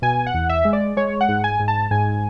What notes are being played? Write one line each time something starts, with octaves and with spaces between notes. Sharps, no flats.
B2 G#5
F#5
E2
E5
G#3
D5
G#3 C#5
F#5
G#2
G#5
G#2
A5
G#2 G#5